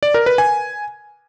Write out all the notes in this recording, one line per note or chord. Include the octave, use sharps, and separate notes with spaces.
D5
A#4
B4
G#5